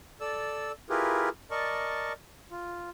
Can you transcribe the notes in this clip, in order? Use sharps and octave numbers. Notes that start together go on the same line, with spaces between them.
A4 D5 E6
E4 F4 G4 G#4 A#4 B4
A#4 D5 D#5 A5 C#6
F4